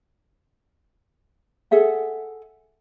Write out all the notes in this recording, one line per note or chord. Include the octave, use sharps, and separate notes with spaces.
G#4 A4 E5 F#5